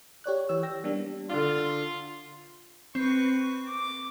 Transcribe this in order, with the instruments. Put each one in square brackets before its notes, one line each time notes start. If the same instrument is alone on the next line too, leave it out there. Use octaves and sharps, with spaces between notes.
[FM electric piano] G4 C#5 D5 F#6
E3 C#5 E6
G4 G5 E6 A#6
G3 A#3 B3 D4
[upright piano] D3 D4 [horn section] F4
[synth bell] C4 [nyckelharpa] B4 C#6
[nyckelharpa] D6